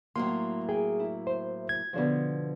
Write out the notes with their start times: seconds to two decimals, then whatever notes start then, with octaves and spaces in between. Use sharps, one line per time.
0.16 A2 F#3 A#3 C6
0.69 G#4 G5
0.99 E4
1.27 C5
1.69 G#6
1.93 B2 D3 F3